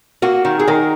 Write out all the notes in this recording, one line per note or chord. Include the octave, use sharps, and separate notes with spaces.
A#3 F#4
D#3
G#4
D#3 A#4